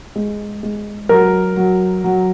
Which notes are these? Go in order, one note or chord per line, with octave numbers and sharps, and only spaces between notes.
G#3
G#3
F#3 A#4
F#3
F#3